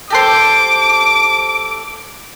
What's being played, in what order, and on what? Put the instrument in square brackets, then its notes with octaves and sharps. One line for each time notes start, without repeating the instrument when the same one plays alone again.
[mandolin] G4 A4 C5 [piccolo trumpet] D6